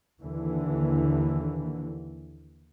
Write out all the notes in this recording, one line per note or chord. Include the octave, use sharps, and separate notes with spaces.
D#2 D3 E3